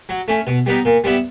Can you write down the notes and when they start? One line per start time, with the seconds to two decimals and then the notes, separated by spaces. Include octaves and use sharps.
0.09 F#3
0.28 A3 C#4
0.47 B2
0.66 G3 B3 D#4
0.85 A#2
1.04 G3 B3 E4